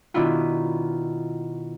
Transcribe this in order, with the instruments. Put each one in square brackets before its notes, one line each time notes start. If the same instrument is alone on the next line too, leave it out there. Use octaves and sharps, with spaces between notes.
[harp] B2 D#3 D4 E4 F4